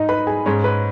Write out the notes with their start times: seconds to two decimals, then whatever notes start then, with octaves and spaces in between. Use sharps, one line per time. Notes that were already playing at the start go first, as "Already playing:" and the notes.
Already playing: G#2 D#4 D#5
0.09 B4 B5
0.27 G#4 G#5
0.46 G#2 G#3 C#4 C#5
0.64 B4